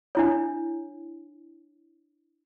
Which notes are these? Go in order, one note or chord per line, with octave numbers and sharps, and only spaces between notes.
D4 E4 C#5